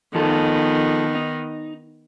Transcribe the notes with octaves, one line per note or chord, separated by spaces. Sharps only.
D#3 F3 B3 D#4 A4
D#4